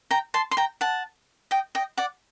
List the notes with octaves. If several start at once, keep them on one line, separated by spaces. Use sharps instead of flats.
G5 A#5
A5 C6
C6
G5 A#5
F#5 A5
D#5 G5
D#5 G5
D5 F#5